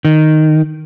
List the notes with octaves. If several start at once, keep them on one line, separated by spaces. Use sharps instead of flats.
D#3